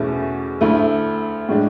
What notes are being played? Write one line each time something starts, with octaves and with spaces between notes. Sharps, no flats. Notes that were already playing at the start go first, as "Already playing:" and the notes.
Already playing: E2 B2 A3 C#4 E4
D2 D3 A3 E4
A2 G#3 D4